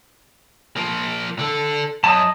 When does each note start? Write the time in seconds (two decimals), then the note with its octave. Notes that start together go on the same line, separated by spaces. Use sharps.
0.76 F3 A#3
1.39 D3 A4
2.04 F#2 D#5 A5